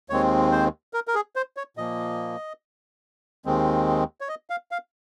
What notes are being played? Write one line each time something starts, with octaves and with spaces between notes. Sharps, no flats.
D#2 D#3 G#3 C4 C#5
C5
A#4
A#4
G#4
C5
C#5
A#2 F3 A#3 D#5
D#2 D#3 G#3 C4
C#5
D#5
F5
F5